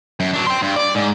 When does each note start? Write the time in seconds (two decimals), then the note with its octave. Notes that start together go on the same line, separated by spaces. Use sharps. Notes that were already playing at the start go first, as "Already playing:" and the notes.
0.20 F#2
0.34 F#3 D4
0.47 G5 C6
0.62 G2
0.76 D5
0.95 G#2